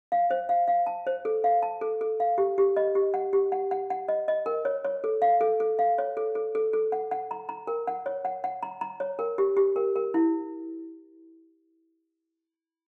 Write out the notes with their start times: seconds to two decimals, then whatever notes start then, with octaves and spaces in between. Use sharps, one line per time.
0.12 F5
0.30 C5
0.49 F5
0.68 F5
0.86 A5
1.07 C5
1.25 A4
1.44 F5
1.62 A5
1.81 A4
2.01 A4
2.20 F5
2.38 G4
2.58 G4
2.76 D#5
2.95 G4
3.14 F#5
3.33 G4
3.52 F#5
3.71 F#5
3.90 F#5
4.08 D#5
4.28 D#5
4.46 A#4
4.65 C#5
4.84 C#5
5.04 A4
5.22 F5
5.41 A4
5.60 A4
5.79 F5
5.98 C#5
6.17 A4
6.35 A4
6.55 A4
6.73 A4
6.92 F#5
7.11 F#5
7.31 A#5
7.49 A#5
7.67 A#4
7.87 F#5
8.06 C#5
8.25 F#5
8.44 F#5
8.63 A#5
8.81 A#5
9.00 C#5
9.19 A#4
9.38 G4
9.57 G4
9.76 A#4
9.96 A#4
10.14 E4